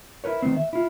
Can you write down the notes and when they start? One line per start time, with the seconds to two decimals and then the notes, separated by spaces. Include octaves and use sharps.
0.24 E4 A#4 B4 C#5
0.42 D#3 A3 B3 C4
0.57 E5
0.73 E4 F4